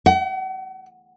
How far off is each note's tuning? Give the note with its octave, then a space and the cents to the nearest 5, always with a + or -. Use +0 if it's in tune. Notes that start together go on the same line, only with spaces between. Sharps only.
F#5 +45